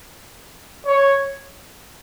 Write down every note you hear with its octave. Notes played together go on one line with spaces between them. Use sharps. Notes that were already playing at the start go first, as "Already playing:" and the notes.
C#5